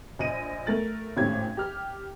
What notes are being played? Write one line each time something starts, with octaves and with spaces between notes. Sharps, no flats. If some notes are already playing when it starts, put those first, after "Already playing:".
A#1 D#5 D#7
A3 A#4 A6 F#7
G#1 A2 C#4 G4 G#6
G4 F6